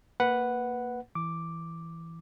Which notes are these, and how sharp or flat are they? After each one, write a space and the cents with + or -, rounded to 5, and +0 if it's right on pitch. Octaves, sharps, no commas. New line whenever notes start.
A#3 -10 B4 +0 F#5 +0
E3 +0 D6 +0